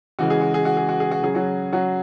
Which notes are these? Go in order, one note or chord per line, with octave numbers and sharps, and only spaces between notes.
C#3 E3 G#3 F#4
G#4
F#4
G#4
F#4
G#4
F#4
G#4
F#4
C#3 F#3 G#4
F#3 F#4
F#3 F#4